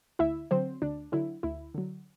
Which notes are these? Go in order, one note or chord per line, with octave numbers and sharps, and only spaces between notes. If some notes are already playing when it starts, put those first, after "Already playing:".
D2 E4 E5
D3 F#3 C4 C5
D2 D4
D3 F#3 E4
D2 E4
D3 F#3